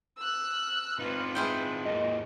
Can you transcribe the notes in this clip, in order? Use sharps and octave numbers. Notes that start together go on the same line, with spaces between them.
E6 F#6
F6
C4 D#4 F4 B4
G#3 E4 G5
G#2 A#3 D#5